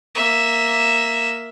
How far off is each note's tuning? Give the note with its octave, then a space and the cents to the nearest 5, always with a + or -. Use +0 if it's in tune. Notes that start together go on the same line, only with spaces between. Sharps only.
A#3 +0 E5 +0